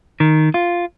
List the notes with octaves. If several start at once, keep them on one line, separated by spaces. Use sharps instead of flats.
D#3
F4